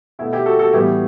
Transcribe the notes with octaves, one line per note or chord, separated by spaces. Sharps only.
B2 A3 E4
E4 G4
F#4 A4
F#4 A4
A2 E3 G3 B3 E4 G4